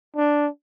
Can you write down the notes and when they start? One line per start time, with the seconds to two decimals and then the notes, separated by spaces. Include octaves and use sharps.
0.16 D4